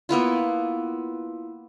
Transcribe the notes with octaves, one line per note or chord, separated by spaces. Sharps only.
A#3 B3 E4 F4